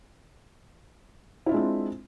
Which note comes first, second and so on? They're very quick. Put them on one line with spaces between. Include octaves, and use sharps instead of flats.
E4 F4 D4 G#3 C4